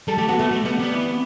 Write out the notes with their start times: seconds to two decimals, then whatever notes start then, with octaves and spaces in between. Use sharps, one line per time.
0.08 G3 A4
0.18 A3 G4
0.28 B3 F#4
0.39 A3 B3
0.50 G3 A3
0.65 G3 B3
0.79 G3 B3
0.94 E3